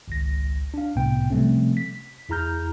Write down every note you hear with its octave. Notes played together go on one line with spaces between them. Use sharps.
G#1 C#2 A#6
D4 F5
C2 A2 C3 B3 G5
C3 F3 G3 A3 C4 C#4
B6
E2 E4 G#4 A#5 F6 G6